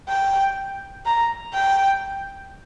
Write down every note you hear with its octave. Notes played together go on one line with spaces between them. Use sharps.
G5
A#5
G5